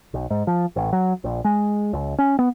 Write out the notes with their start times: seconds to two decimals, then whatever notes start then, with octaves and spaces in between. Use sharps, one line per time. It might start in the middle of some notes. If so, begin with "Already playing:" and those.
0.14 B1
0.30 G#2
0.47 F3
0.76 A1
0.93 F#3
1.24 A#1
1.45 G#3
1.93 C#2
2.18 C#4
2.39 B3